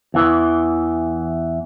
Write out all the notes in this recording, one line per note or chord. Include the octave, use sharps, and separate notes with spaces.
E2 E3